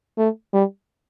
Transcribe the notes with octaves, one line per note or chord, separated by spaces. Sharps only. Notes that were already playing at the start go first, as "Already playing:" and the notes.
A3
G3